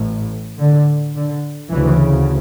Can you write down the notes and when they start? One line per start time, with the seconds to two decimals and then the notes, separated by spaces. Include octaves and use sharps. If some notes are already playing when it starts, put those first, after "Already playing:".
Already playing: A1 A2
0.59 D3
1.15 D3
1.71 D2 C#3 E3